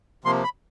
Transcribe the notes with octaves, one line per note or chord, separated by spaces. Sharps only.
C3 F3 A#3 C6
B5